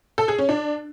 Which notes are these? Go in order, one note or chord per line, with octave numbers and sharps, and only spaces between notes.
A4
G#4
C#4
D4